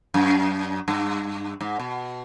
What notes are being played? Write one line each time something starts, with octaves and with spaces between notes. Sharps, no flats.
F#2
G2
G#2
B2